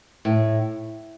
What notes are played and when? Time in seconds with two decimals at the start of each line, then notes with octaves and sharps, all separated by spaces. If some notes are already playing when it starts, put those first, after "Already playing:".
0.25 A2